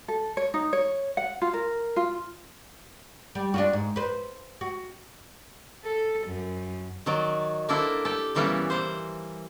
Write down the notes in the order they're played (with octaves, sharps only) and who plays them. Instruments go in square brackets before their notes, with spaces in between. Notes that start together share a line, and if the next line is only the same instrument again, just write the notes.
[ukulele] A4
C#5
D#4
C#5
F#5
F4
A#4
F4
[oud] G3
D4 F4 F#4
G#2
B4 C5
F#4
[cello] A4
F#2
[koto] D#3 F#3 D5
A#3 D4 E4 A4 A#4 C5
G4 A4
A#2 C#3 E3 G3 A#3 B3
E3 C5